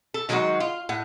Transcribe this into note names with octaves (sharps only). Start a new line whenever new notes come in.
A4
D#3 F#3 G#3 C#4 D#4 F#4
F4
A2 F#5